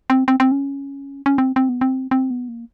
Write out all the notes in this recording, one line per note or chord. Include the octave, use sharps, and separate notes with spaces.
C4
C4
C4
C#4
C#4
C4
C4
B3
C4
C4
B3
A#3